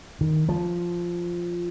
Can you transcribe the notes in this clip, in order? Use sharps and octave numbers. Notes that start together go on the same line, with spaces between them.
D#3
F3